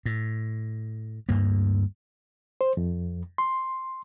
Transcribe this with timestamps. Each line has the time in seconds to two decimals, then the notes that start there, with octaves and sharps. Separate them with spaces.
0.06 A2
1.29 D2 G2 A#3
2.61 C5
2.77 F2
3.38 C6